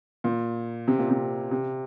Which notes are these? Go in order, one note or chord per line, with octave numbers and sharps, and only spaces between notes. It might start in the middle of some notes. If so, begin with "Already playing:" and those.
A#2
C3
A#2
C3
C3